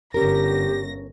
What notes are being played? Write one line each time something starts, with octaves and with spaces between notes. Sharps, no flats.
G1 C#4 G4 A#4 A#6